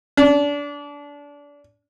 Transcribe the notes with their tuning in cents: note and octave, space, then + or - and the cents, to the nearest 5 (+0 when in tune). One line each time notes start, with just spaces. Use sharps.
D4 -25